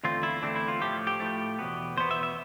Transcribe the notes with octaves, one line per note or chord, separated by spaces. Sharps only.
E2 D3 A3 C4 F4
E4
E2 D3 A3 C4 D4
E4
F4
A2 F3 A3 G4
G4
A2 F3 A3
E2 B2 B3
E2 B2 B3 C5
E5
E5